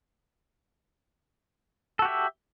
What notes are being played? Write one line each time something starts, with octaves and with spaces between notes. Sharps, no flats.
F#4 G4 A4 E5